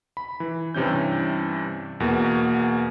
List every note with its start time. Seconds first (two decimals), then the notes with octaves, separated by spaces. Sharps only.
0.17 B5
0.40 E3
0.74 G2 C3 E3 C#4 G6
2.00 E2 B2 A#3